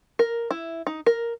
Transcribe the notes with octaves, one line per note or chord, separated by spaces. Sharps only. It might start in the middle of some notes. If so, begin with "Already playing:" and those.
A#4
E4
D#4
A#4